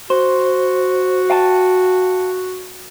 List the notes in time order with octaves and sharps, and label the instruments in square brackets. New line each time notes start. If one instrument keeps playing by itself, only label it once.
[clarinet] F#4 [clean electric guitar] C5
[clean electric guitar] F5 G5 A5